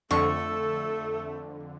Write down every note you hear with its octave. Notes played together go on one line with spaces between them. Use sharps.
F2 D3 A3 A4 C#6